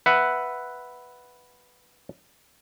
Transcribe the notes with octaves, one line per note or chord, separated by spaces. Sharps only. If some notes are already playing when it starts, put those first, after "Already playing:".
B4 E5 F#5